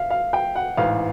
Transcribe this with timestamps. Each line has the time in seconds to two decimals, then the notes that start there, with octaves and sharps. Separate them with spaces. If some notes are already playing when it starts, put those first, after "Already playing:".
Already playing: E5 F5
0.11 F5
0.33 G5
0.55 F#5
0.77 A1 G#2 E3 F5